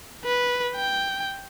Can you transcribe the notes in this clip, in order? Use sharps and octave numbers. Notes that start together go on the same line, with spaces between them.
B4
G5